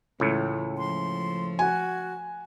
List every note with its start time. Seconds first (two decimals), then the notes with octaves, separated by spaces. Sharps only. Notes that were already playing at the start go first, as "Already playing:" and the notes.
0.20 C#2 A2 E3
0.78 F3 A3 C6
1.59 F#4 G#5